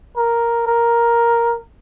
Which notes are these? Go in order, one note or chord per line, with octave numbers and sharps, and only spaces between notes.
A#4
A#4